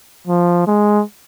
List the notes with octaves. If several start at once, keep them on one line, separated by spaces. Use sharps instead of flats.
F3
G#3